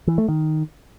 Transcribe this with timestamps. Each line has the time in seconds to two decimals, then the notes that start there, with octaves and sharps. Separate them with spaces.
0.07 E3
0.18 A3
0.28 D#3